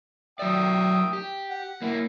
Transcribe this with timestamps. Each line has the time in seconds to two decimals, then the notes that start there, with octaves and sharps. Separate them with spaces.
0.39 F#3 D5 E5 G5 D#6
1.13 G4
1.50 F#5
1.82 A#3 E4